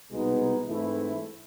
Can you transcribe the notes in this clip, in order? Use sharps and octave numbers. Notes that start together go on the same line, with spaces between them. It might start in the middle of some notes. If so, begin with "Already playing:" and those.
C2 B2 G#3 B3 D#4
G#2 E3 A3 C4 E4